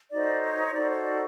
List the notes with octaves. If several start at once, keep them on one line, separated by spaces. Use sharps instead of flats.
D#4 F#4 A4 C5 D5
C#5
D#4 F#4 A4 C5 D5
C#5
D5